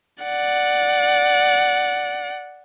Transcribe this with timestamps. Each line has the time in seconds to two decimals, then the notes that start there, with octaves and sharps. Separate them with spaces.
0.24 D5 F#5